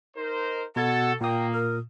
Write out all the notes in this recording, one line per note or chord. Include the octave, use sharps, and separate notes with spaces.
D#4 A#4 C5
B2 F#4 A4 F#5 G#6 A6
A#2 A#3 G5 D#6
A#4